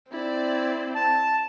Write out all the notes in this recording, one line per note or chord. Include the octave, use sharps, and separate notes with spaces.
C4 E4 D5
A5